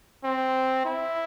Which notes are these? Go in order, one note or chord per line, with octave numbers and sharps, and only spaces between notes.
C4
E4